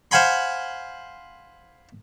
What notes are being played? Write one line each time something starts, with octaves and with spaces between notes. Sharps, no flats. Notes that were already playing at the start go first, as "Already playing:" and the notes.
C5 F5 F#5 G#5 B5 C6